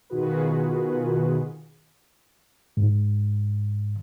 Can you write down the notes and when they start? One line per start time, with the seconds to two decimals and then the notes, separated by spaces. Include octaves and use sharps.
0.10 B2 D#3 F4 F#4 G#4 B4
2.77 G#2